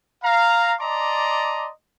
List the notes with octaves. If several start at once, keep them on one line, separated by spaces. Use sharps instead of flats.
F5 A#5
D5 D#5 A5 A#5 C6 D6